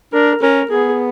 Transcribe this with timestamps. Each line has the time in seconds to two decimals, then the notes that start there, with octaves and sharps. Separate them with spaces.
0.13 D4 A#4
0.42 C#4 A#4
0.71 B3 G#4